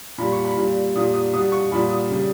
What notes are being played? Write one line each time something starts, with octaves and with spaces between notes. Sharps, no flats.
A#2 G3 B5
C#6
B5
A#2 G3
A#2 G3 D#6
D#6
B2 G3 D#6
C#6
A#2 G3 B5
D#6
C#3 G3